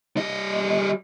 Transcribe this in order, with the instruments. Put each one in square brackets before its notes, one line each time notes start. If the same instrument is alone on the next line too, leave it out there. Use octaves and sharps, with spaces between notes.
[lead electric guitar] G3 D#5